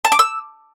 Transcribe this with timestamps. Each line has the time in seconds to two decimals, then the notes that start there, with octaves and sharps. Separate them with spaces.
0.05 A5
0.12 D6
0.19 E6